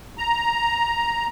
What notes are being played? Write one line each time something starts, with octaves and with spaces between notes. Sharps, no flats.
A#5